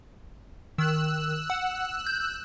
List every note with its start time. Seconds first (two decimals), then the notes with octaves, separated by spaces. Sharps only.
0.78 D#3 E6 F#6
1.50 F#5
2.07 G6